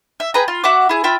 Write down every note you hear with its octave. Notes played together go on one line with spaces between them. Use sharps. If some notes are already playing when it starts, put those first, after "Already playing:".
E5
G#4 B4 G5 A#5
F4
F#4 E5 F#5 D6
E4 G#4
F4 E5 G5 B5